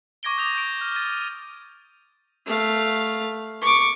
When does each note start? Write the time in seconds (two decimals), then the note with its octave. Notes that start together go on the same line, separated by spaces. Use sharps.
0.23 C#6 D6 G#6 A#6 D7 G7
0.38 D#6 G6 G#6 A#6 F7
0.55 G6 D7
0.81 F6
0.96 G#6 A6 D#7
1.13 D#7
2.46 A3 F5
3.62 C#6 D6